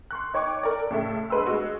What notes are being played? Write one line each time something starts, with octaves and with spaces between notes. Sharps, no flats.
C6 C#6 F#6
D#4 C#5 G5 C#6 D6
A4 A#4 D5
A2 C#3 A4 E5
A#1 G#3 B4 C6 E6
G#3 F#4